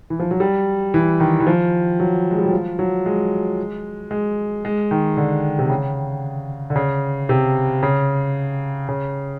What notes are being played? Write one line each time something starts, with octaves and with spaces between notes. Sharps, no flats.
E3
F3
F#3
G3
E3
D#3
E3
F3
F#3
G#3
G3
F#3
F3
F#3
G#3
G#3
G#3
D#3
D3
C3
C#3
D3
C#3
C3
C#3
C#3